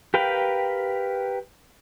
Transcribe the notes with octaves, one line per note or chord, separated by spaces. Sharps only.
G4 A#4 B4 F5 G5